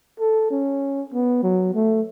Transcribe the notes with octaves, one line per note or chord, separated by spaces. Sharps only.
A4
C#4
B3
F#3
A3